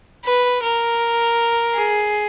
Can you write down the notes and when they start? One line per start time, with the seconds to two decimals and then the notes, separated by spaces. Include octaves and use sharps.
0.25 B4
0.62 A#4
1.75 G#4